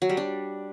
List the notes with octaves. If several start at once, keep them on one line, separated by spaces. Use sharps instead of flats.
F#3
G3
D4